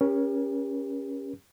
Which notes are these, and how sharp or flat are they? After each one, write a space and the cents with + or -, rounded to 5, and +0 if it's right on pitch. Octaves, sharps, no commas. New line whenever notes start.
C#4 +0 G4 +35 A#4 +40